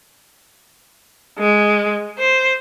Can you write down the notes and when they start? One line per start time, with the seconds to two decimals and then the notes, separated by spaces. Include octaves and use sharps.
1.39 G#3
2.18 C5